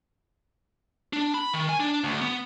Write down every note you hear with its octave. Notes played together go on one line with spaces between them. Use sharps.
D4
B5
D#3
G#5
D4
D2
B3